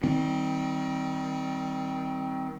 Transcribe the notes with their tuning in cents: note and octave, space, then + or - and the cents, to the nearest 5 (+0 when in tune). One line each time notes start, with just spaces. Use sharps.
D#3 +30 G3 +0 C4 +0